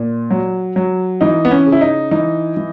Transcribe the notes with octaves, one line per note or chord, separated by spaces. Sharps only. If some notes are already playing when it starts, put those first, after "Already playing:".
Already playing: A#2
F#3
F#3
E3 D#4
B3
C#4
C#3
E4
D#4
E3 D#4
E3